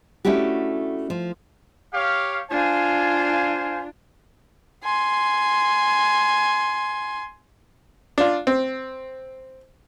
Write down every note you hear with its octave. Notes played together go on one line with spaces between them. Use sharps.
A3 C#4 D4 E4 F#4 G4
F3
G4 C#5 F5
D4 F4 C5 F5 G#5
G#5 C6
D4 F4
C4